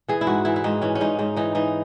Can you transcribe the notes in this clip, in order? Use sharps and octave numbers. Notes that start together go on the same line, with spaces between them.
E3 G#4
E4
G#2 F#4
E3 E4
E4
G#2 D#4
E3 C#4
C#4
G#2 D#4
G#2 D#4
E3 D#4
E3 D#4